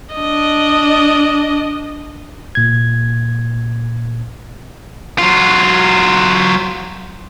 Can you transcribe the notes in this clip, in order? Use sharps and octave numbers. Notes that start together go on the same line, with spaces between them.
D4 D#5
A#2 G#6
F#3 F4